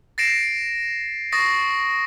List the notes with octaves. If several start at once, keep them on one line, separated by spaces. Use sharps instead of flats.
A6 A#6 C7 D7 E7
C#6 D#6 A6 A#6 C7